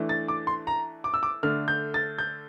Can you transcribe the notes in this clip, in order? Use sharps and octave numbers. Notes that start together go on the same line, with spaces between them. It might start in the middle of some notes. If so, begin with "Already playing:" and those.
Already playing: E3 A3 D4
A6
D6
C6
A#5
D6
E6
D6
D3 A3 D4 F6
G6
A6
G6